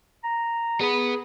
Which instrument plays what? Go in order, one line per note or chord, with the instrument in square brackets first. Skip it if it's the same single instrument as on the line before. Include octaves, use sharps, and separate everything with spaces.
[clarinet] A#5
[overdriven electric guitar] B3 B4 [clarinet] G#4